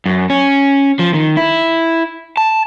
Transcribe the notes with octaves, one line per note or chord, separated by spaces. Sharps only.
F#2
C#4
F3
D#3
E4
A5